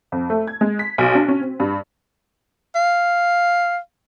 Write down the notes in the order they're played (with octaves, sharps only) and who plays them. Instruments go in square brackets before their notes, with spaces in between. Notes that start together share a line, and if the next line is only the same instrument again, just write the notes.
[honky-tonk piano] F2
A3
G#6
G#3
B6
B1
D4
C#4
C4
G2
[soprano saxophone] F5